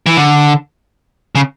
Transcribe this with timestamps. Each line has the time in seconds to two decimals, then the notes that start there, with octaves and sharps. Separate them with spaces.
0.06 E3
0.17 D3
1.35 C#3